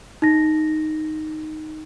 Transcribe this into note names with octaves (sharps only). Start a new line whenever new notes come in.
D#4 A#6